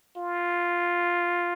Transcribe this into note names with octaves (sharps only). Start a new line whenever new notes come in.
F4